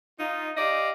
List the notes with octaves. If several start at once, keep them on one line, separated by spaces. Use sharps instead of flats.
D#4 F4
G4 D5 D#5 F5